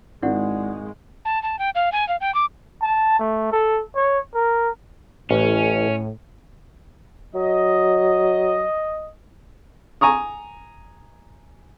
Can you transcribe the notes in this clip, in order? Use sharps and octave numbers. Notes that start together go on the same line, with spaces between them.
G#1 G#3 E4 D5 F#5
A5
A5
G5
F5
G#5
F5
G5
D6
A5
A3
A4
C#5
A#4
A1 A2 C#4
F#3 D#5
G#5 A#5 C#6 D#6